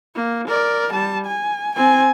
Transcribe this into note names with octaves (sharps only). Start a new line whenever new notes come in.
A#3
A#4 D5
G3 A5
G#5
C4 G#5